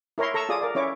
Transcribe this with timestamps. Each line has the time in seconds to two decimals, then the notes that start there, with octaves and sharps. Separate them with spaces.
0.18 E4 A#4 C#5 A#5 C6
0.34 A4 A#5 C#6 E6
0.49 F4 G#4 D5 D#6
0.61 A#4 D5
0.75 C#4 E4 C#5 D6